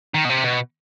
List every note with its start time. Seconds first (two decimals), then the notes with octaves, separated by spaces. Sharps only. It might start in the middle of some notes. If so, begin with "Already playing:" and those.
0.14 D#3
0.25 B2
0.29 C3
0.44 B2